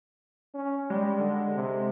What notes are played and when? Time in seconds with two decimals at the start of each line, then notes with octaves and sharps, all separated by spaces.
0.54 C#4
0.90 G3 G#3
1.19 D3
1.55 C3